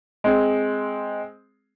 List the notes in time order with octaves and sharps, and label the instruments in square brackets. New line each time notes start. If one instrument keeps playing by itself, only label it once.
[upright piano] G#3 C4